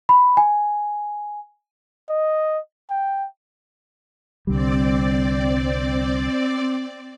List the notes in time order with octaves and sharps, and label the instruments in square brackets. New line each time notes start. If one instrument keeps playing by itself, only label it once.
[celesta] B5
G#5
[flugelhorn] D#5
G5
[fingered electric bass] C2 D3 G3 [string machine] C4 D5